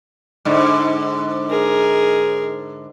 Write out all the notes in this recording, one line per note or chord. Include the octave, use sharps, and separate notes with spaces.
G#2 D3
G#4 A#4